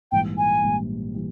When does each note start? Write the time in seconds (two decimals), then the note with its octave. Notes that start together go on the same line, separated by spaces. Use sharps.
0.12 A#1 G#2 E3 G3 G5
0.38 G#5
0.64 A#1 G#2 E3 G3
1.15 E3 G3